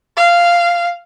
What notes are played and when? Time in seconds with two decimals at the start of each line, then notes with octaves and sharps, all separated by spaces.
0.17 F5